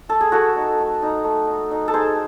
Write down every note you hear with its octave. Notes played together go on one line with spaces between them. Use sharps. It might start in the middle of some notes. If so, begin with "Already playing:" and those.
A3 A4
G#4
A3 F#4 A4
D#4
A3
D#4
A3
D#4
D#4
A4
D#4 G#4 C5